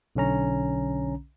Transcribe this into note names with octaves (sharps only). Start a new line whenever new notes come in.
B1 D3 C#4 A#5